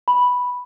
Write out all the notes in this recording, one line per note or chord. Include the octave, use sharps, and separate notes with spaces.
B5